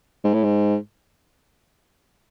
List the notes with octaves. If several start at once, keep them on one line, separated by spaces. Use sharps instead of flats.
G#2
A2
G#2